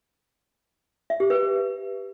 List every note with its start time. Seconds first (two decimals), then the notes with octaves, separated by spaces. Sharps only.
1.10 E5
1.20 G4
1.30 B4